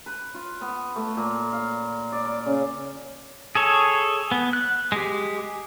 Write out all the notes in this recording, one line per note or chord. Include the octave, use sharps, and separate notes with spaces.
B4
F4
B3
A3
A#2
F5
D5
D6
C#3
G#4 A4 C#5
B3
F#6
G#3 G4